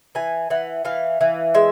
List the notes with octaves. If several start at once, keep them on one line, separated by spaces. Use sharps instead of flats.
E3 G#5
E3 F#5
E3 F5
E3
G#3 E5